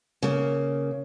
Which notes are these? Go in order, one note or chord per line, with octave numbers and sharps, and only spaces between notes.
C#3 A#3